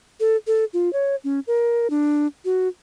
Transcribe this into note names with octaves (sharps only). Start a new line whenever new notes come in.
A4
A4
F4
C#5
C#4
A#4
D4
F#4